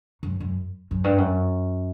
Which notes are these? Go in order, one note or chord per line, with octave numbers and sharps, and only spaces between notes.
F#2
F#2
F#2
G2
F#2